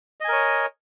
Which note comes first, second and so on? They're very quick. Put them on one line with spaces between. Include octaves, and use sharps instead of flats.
D#5 G#5 A#4 C#5